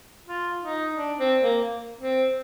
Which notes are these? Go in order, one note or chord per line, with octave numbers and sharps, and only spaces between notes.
F4
D#4
D4
C4
A#3
C4